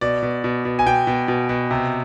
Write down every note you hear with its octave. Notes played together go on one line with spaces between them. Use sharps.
B2 D5
B2
B2
B2
G#5
B2 G5
B2
B2
B2
C3